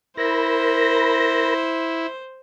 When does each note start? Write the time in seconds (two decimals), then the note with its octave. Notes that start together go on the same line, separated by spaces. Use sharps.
0.17 E4 A#4 C5 B5 A#6